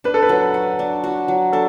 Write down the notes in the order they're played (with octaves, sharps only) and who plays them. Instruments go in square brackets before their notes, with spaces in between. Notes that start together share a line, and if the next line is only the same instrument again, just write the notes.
[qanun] D4 [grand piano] B4
[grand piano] A4
B4
[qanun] F#3
F#4
D4
F#4
F#3
[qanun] D4 [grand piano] A4